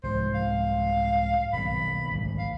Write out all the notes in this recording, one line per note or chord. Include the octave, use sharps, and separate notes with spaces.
C2 G#2 F3 C5
F5
D#1 B1 B5
G#1 D2
F5